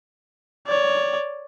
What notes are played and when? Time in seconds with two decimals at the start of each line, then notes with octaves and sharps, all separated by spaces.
0.67 C#5 D5